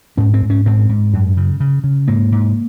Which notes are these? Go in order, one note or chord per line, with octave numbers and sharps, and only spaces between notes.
G#2 C#4
C4
G#2
C#4
G#2 C4
G#2
F#2
C#3
C#3
C#3
G#2 A#3
G#2